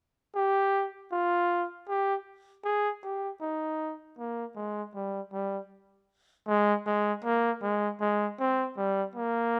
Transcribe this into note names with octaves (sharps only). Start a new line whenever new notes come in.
G4
F4
G4
G#4
G4
D#4
A#3
G#3
G3
G3
G#3
G#3
A#3
G#3
G#3
C4
G3
A#3